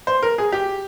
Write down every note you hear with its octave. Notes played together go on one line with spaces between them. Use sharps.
C5
A#4
G#4
G4